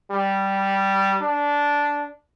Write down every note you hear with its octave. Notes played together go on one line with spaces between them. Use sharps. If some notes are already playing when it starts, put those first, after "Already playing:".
G3
D4